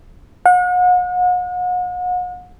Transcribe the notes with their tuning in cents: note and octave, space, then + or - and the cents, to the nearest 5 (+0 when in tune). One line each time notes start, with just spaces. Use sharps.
F#5 -40